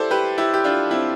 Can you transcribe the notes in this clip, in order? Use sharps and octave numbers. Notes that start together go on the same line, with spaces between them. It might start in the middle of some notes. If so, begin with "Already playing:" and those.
Already playing: E4 G4 A4 C5 D5
G4 B4
E4 G4
G4
D4 F4
C4 E4